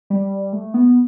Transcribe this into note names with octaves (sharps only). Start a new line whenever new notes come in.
G3
A3
B3